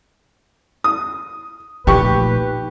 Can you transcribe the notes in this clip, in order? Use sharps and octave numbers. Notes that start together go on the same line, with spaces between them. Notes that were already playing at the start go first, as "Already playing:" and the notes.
D#6
A#2 F3 A3 D#4 G4 B4 C#6